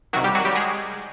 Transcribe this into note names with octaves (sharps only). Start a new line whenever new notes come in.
C2 C3 D#3 F#3 F#4
G3 G4
F#3 F#4
G3 G4
G#3 G#4